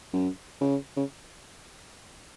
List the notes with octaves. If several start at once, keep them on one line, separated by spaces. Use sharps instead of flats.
F#2
C#3
C#3